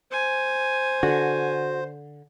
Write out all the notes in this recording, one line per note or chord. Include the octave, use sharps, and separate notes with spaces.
C5 G#5
D3 F#4